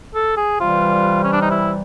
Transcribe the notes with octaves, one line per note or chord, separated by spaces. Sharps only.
A4
G#4
C3 E3 G3 F4
C#4
D4
D#4
E4